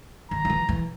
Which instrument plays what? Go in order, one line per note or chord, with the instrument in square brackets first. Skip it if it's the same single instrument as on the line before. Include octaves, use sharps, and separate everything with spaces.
[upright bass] D#3 [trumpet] A#5
[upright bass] D#3
E3
E3